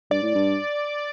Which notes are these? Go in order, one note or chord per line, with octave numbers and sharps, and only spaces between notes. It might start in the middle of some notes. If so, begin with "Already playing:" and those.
G2 D5
A2
G2